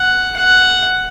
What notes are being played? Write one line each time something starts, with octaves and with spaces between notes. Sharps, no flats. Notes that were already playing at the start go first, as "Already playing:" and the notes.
Already playing: F#5
F#5